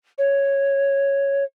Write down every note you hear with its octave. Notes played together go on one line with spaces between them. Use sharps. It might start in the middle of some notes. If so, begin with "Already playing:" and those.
C#5